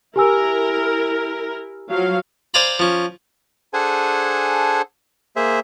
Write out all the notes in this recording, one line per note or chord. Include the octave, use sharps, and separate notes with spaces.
E4 G4 A#4 G#5 E6
F3 F#3 F5
C5 D5 F5 G#5 A#5 B5
F3 C#4
D4 G#4 A4 C5 F#5 G#5
A#3 G#4 C5 E5